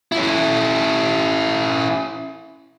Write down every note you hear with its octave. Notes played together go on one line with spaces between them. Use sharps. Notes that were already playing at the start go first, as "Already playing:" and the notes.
C#4 E4